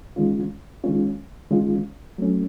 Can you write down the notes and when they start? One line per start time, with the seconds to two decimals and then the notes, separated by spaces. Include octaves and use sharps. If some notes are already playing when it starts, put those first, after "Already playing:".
0.16 D#3 G#3 C#4 F4
0.84 D#3 G#3 C#4 F4
1.51 D#3 G#3 C#4 F4
2.18 F#3 A3 C#4